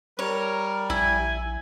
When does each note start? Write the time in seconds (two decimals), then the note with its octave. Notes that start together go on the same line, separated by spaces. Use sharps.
0.19 G3 A#4 C#5
0.90 A#1 E4 G#5